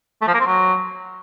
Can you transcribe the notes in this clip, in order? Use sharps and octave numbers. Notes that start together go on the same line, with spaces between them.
A3
F3
A#3
C4
F#3